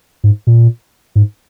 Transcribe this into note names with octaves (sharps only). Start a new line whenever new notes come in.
G#2
A#2
G#2